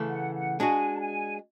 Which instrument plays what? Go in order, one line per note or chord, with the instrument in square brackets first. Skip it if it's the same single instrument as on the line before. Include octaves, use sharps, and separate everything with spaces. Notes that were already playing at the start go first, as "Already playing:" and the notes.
Already playing: [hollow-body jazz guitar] C#3 E3 A3
[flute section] F#5
F#5
[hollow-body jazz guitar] G#3 D4 F#4 [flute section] G#5
[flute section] A5
G#5